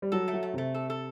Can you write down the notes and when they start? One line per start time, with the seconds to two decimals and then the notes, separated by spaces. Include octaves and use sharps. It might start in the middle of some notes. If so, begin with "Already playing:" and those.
0.02 G3
0.12 F#3 A4
0.28 A3
0.33 F#3
0.43 A3
0.54 C3 A3
0.74 A4
0.90 A4